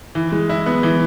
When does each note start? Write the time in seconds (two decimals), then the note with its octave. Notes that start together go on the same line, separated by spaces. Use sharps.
0.15 E3
0.32 G#3
0.49 E4
0.66 B3
0.83 E3